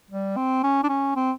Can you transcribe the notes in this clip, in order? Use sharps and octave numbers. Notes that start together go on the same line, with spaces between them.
G3
C4
C#4
D4
C#4
C4